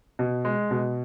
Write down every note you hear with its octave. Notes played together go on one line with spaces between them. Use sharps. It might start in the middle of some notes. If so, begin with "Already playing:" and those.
B2
G#3
B2